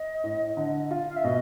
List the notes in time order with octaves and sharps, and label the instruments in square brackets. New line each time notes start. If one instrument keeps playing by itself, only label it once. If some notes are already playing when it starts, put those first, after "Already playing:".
Already playing: [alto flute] D#5
[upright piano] A2
D3
F4
[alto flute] F5
E5
[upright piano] B2 [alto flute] D#5